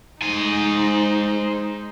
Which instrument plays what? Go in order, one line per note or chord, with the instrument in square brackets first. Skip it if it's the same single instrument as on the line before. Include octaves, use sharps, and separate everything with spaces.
[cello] G#3 D#4 [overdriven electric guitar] C5 G#5